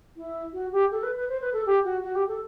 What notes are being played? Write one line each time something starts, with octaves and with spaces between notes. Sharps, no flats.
E4
F#4
G4
A4
B4
B4
C5
B4
A4
G4
F#4
F#4
G4
A4